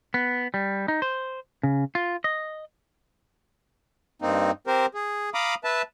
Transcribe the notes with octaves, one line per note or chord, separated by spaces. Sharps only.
B3
G3
D#4
C5
C#3
F4
D#5
G2 A#3 C4 D#4
C4 G4 A#4 C5
G#4
F5 A#5 B5 D6 D#6
B4 E5 A5